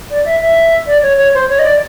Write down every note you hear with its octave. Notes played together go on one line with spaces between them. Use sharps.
D5
E5
E5
D5
C#5
C#5
C5
C#5
D#5
D5